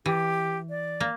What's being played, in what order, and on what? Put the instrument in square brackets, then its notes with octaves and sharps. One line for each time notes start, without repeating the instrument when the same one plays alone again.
[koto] E3 [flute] G4
[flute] D5
[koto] A#3